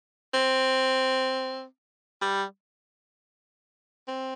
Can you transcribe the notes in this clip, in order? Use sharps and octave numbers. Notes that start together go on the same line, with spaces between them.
C4
G3
C4